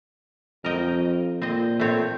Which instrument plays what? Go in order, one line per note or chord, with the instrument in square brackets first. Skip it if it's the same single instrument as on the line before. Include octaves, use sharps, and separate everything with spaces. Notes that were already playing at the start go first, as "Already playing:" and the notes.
[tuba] F2 [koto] A#4 D#5 G5
[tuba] A#2 [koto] C4 D#5
[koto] A3 C4 C#5